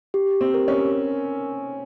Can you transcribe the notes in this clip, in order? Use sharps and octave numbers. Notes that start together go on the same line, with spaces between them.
G4
C4
A#4
C#4